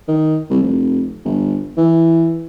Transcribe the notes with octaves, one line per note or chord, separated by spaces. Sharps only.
D#3
C2
F1
G1
E3